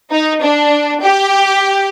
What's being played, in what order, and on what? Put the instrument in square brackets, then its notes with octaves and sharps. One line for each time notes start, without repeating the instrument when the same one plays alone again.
[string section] D#4
D4
G4